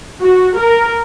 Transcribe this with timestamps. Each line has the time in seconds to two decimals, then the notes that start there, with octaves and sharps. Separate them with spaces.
0.22 F#4
0.58 A#4